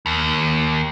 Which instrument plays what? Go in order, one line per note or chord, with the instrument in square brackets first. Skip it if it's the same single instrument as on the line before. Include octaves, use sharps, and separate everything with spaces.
[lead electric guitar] D#2